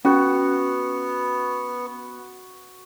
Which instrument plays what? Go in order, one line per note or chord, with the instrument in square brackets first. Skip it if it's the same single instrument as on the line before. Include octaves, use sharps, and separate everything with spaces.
[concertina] B3 [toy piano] C#4 [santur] F#4